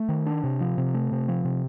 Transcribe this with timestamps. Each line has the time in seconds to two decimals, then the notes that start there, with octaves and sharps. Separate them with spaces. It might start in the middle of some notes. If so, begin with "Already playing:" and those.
Already playing: A3
0.09 D#3
0.27 D4
0.44 C3
0.61 F3
0.78 C3
0.94 A3
1.12 C3
1.28 F3
1.45 C3